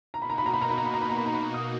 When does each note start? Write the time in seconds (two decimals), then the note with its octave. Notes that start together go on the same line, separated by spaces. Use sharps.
0.14 B2 A#3 D#4 F#4 A#5
0.22 B5
0.30 A#5
0.38 B5
0.46 A#5
0.54 B5
0.61 A#5
0.70 B5
0.78 A#5
0.86 B5
0.94 A#5
1.02 B5
1.10 A#5
1.17 B5
1.26 A#5
1.33 B5
1.41 A#5
1.54 D#6